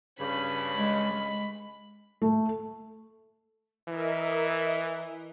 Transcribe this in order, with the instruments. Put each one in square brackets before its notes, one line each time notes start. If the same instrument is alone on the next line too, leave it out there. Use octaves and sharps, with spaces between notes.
[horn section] G2 C#3 [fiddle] B5
[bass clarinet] G#3
G#3
[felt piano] A3
[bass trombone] E3 [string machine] A#4 D#5 E5